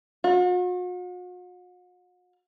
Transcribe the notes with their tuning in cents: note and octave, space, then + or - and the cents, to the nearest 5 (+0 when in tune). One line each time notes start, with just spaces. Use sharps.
F#4 -45